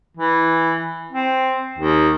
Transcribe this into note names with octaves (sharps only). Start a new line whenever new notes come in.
E3
C4
D#2